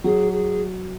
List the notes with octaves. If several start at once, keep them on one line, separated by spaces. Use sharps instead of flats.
F#3 G#4
G#4